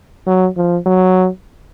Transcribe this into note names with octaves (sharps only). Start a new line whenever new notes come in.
F#3
F3
F#3